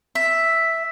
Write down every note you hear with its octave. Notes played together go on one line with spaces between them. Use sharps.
E5